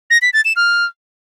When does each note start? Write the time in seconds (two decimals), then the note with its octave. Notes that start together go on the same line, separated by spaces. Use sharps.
0.10 A#6
0.22 B6
0.33 A6
0.45 E7
0.56 F6